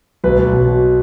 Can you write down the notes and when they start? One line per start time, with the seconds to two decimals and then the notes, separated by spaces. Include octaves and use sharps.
0.24 B1 B4
0.39 B1
0.53 B2
0.68 B2